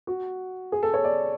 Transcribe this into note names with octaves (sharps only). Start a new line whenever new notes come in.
F#4
G#4
A4
C#5
D5